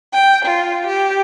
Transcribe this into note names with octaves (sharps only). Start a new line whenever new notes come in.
G5
F4
G4